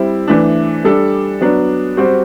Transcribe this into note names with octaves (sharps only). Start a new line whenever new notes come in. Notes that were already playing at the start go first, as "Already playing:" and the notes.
Already playing: G3 C4 E4
E3 A3 D4
G3 D4 A4
F#3 B3 D4
G3 C4 F#4 C5